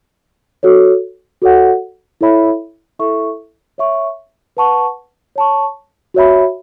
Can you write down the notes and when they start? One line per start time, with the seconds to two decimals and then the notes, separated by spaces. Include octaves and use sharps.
0.63 F#4 A4 C#5
1.42 F#4 A4 C#5 F#5
2.21 E4 A4 C#5 E5 B5
2.99 E4 A4 E5 C#6
3.78 C#5 E5 C#6
4.57 B4 F#5 A5 C#6
5.36 C#5 A5 C#6
6.14 F#4 C#5 E5 B5